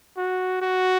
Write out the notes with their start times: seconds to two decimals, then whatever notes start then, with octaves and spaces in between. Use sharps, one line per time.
0.17 F#4
0.62 F#4